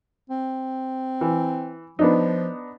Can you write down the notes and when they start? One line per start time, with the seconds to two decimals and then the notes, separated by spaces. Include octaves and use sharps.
0.30 C4
1.21 E3
1.99 F3 B3 D4 D#4